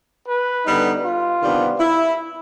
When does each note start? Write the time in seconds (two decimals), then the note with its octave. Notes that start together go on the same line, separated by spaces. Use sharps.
0.27 B4
0.66 D3 G3 B3 D#4
1.03 F4
1.42 C3 D#3 G3 B3 D4
1.80 E4